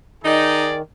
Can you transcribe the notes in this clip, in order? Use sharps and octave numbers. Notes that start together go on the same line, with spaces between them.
D#3 D#4 G#4 D5